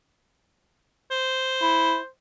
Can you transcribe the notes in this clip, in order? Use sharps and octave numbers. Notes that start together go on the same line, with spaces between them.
C5
E4